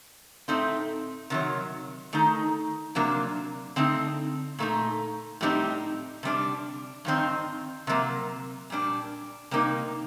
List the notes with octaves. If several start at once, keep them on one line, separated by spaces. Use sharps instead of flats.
A2 A3 C4 D#4
C3 D#3 F#3
D#3 A3 D#4
C3 F#3 A#3 D4
D3 A3 C4 D#4
A#2 A3 D#4
A2 G3 C4 D#4
C3 G3 D4
G2 D#3 F#3 C4 D#4
C3 F#3 A#3
A#2 G3 D4
C3 G3 A#3 D#4